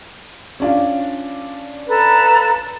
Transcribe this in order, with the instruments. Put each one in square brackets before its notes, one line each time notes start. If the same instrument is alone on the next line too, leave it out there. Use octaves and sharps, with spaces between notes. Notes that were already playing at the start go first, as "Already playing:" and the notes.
[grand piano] C#4 D4 F4
[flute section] A4 B4 A#5